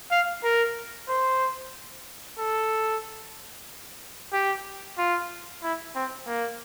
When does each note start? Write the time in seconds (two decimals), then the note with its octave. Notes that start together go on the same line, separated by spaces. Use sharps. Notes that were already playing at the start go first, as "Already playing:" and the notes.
0.11 F5
0.44 A#4
1.08 C5
2.38 A4
4.33 G4
4.98 F4
5.63 E4
5.95 C4
6.27 A#3